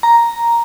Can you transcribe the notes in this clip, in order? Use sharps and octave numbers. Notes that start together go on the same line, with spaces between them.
A#5